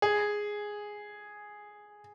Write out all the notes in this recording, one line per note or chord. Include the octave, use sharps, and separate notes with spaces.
G#4